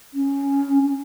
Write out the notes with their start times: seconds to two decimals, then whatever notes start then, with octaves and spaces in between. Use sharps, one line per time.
0.14 C#4
0.87 C#4